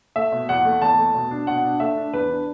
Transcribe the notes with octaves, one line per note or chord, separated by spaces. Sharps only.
A3 E5
B2
E2 F#5
A3
E2 A5
A3
B2
D4
B2 F#5
D4
A3 E5
D4
E2 B4
D4